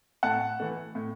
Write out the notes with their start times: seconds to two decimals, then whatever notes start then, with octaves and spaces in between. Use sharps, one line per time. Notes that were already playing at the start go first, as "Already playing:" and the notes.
0.23 A2 F#5 A5
0.60 E3 A3
0.95 A2